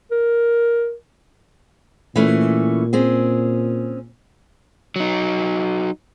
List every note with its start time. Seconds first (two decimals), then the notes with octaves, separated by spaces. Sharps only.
0.11 A#4
2.16 A#2 E3 A3 C#4
2.93 C4 C#4 G#4
4.96 F#3 D#4